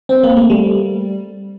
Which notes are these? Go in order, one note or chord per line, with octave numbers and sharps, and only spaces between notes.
C4
A#3
A3
G3